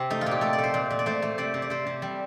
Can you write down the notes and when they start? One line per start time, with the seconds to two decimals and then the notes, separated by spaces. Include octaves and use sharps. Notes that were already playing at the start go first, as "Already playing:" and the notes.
Already playing: C3 C4
0.10 A3 D#4
0.21 F4
0.26 A#2
0.31 G4
0.41 A3 A4
0.53 D5
0.59 A3
0.64 C5
0.74 A#2
0.90 A#2
0.99 D5
1.06 A3 C5
1.22 A3
1.38 C3 D5
1.54 C3
1.62 D5
1.70 C3 C5
1.86 C3
2.02 G3